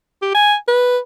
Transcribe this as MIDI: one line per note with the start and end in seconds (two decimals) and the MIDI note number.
0.22 0.31 67
0.35 0.55 80
0.68 0.98 71